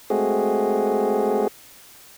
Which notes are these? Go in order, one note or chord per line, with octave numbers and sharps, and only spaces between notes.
G#3 A3 C4 F#4 G#4